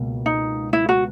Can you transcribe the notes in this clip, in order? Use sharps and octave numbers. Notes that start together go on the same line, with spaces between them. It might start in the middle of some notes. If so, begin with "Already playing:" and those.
Already playing: C#2 B2 A#3
D#4
E4
F#4